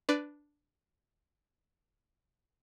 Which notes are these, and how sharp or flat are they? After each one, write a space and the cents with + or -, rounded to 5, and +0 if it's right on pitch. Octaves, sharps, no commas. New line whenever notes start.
D4 +0 B4 +10 D5 +0